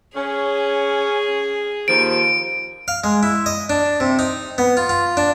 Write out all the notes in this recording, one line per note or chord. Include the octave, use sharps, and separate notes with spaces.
C#4 G#4
D#2 F3 D7
F5
G#3
E4
D#5
D4
C3
D#4
B3
F4
F4
D4